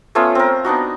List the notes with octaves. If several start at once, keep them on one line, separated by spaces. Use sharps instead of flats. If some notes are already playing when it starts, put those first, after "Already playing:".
A3 B3 C#4 F4
C4 A#4
B3 D4 D#4 F#4